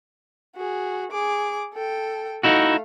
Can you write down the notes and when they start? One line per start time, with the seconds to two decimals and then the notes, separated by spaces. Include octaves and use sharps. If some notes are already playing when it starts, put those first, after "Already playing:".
0.56 F#4 G#4
1.11 G#4 D6
1.73 A4 G5
2.43 A3 D#4 E4 F#4 F5